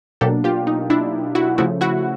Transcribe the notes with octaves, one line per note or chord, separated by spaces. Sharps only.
B2 F#3 A#3 D4 G4 A4
F4 G4
D#4
D4 E4
E4 F#4
C#3 F3 A3 E4 F#4
E4 F#4